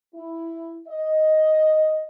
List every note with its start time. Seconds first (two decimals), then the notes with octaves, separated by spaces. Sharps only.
0.13 E4
0.88 D#5